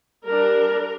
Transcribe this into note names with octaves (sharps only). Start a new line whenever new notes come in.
G3 D4 A#4